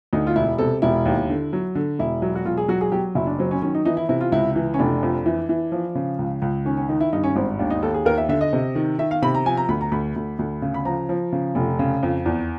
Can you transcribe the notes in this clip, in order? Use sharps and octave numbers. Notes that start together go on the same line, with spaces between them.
D2 D#4
F4
E1 E4
C3 A4
E1 E4
D#2
D3
F#3
D3
E1 E4
F#3
F#4
E1 F4
G#4
F#3 F#4
G#4
F#3 G4
F#1 E4
D4
F#3 C4
C#4
D#3 C#4
D#4
E3 D#4
E4
C3 E4
F4
C#2 E4
E3
C#4
F1 D4
F2
E3
E3
F3
C#3
C#2
C#2
D#3 C#4
C#4
D#3 D#4
E4
G2 D#4
C#4
G#1 C4
D#2 D4
D#4
D#2 A4
G#4
D#2 A#4
E5
D3 E5
D#5
C3
D#3
D#3 E5
F5
C3 B5
A#5
F3 G#5
A#5
D2 B5
A#5
D2 B5
D2
D2
C#3
B5
F3 A#5
F3
C#3
F1
C#3
F2
E2